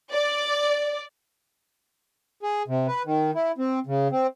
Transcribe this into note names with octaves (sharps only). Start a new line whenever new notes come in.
D5
G#4
C3
B4
D#3
E4
C4
C#3
C4